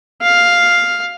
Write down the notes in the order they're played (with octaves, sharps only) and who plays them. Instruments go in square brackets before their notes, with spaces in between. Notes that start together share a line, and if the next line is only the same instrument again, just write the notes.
[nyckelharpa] F5